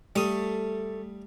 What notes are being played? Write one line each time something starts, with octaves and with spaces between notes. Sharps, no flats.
G3 A3 D#6